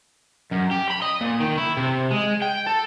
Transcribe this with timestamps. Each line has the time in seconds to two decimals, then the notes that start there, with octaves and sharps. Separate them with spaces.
0.52 F#2
0.72 G4
0.91 B5
1.02 D#5
1.21 A#2
1.40 D#3
1.58 E4
1.77 C3
2.11 G#3
2.42 G5
2.67 A4